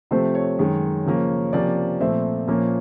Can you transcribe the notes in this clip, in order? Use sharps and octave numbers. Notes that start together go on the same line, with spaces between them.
C3 F3 A3 C4 C5
C#5
F#2 D#3 G#3 C#4
C#3 F3 A#3 C#4
C3 F3 A#3 C#4 D5
A#2 F3 A3 C4 E5
A#2 F3 A#3 C#4